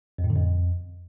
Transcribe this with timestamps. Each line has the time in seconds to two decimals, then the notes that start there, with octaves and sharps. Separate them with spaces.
0.18 F2
0.24 A2
0.30 D3
0.36 F2